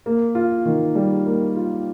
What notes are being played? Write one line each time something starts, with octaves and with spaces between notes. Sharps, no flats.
A#3
F4
D#3
G3
A#3
F4